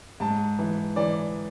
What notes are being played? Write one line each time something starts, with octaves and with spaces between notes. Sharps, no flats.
G#2 A5
E3
E3 D5